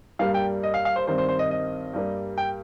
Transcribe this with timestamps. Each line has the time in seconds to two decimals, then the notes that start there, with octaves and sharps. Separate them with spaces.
0.19 G2 G3 A#3 F5
0.34 G5
0.63 D#5
0.74 F5
0.85 F5
0.96 C5
1.07 G2 D#3 C4 C5
1.18 C5
1.28 C5
1.39 D#5
1.51 D#5
1.93 G2 G3 A#3
2.38 G5